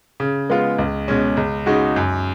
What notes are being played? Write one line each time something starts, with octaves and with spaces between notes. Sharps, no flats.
C#3
G#3 B3 F4
C#2
B2 G#3 C#4
C#2
C#3 G#3 D#4 F#4
F#2